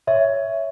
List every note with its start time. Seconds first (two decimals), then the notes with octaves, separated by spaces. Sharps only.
0.07 C#5 E5